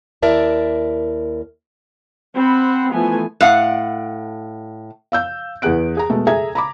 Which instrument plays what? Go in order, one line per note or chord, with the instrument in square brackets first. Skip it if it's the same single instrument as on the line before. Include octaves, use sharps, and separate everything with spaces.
[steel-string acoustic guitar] D#2 E4 A#4 D5 E5 A5
[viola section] C4 F#5 B5
E3 F3 A3 B3 G#5
[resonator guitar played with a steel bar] A2 F5 F#5
[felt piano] F5 E6 G6
E2 B3 G#4 F#5 F#6 D7
G#4 A#5
B2 G#3 A3
G#4 A4 E5 G#5 A#5 G#6
A#5 B5 D6